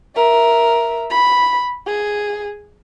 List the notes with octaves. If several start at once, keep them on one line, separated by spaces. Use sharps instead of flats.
A#4 E5
B5
G#4